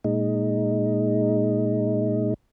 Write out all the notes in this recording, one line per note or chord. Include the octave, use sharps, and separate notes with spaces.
A#2 G#3 D#4